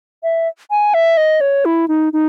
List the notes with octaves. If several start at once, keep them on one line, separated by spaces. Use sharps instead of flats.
E5
G#5
E5
D#5
C#5
E4
D#4
D#4